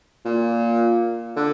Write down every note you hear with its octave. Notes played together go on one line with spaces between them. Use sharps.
A#2
D3